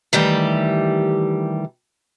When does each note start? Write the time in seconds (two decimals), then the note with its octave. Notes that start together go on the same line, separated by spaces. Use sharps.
0.13 D#3 E3 G3 A3 G4